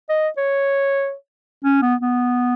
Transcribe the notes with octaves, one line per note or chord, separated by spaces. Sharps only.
D#5
C#5
C#4
B3
B3